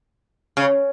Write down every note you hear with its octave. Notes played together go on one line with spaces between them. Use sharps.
C#3